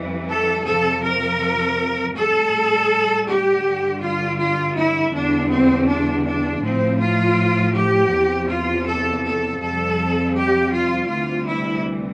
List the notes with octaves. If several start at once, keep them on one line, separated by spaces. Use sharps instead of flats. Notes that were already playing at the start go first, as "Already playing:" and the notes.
Already playing: F2 E3 G3
A4
F2 C3 F3 A4
A#4
A2 G3 A4
G4
G2 D3 G3
F4
F4
E4
E2 D3 G3 D4
C4
D4
D4
A2 F3 C4
F4
G4
E2 C3 F3
F4
A4
A4
F2 C3 G3 A4
G4
F4
D2 C3 E3 G3 F4
E4